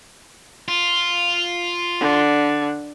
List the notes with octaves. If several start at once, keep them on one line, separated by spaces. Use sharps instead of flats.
F4
D3